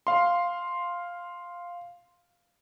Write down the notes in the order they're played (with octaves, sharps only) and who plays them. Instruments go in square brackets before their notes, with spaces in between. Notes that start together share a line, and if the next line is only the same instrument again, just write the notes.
[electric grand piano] F5 C6